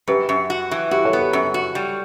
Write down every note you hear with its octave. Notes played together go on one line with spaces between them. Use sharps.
F#2 G4 B4
F#2
F#4
E3
E4 F#4 G4
A4 C#5
B3
G4 B4
F#2
F#4
G3